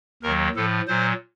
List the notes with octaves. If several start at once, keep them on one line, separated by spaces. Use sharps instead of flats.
D#2 D#3 F#3 A#4
A2 F3 A4
A#2 F#3 C5